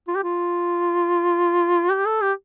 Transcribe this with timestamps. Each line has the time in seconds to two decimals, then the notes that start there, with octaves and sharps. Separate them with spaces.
0.08 F4
0.15 G4
0.23 F4
1.91 G4
2.06 A4
2.21 G4